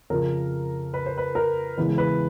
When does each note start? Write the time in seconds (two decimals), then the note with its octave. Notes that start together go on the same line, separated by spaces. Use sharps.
0.10 F2 C#3 F3 A#4
0.94 B4
1.06 C5
1.18 B4
1.35 A#4
1.77 E2 C#3 E3 G#3 B4
1.98 B4